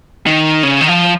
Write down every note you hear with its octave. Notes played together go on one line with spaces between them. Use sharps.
D#3
C#3
D#3
F3